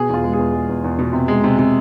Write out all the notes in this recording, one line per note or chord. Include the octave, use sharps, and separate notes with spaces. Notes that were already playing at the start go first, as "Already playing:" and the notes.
Already playing: B2 G#4
E2 F4
G#3
G#4
E2
G#3
E2
E2
B2
C3
G#3
C3
C3